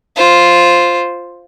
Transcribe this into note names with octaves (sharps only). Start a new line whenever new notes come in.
F4 C5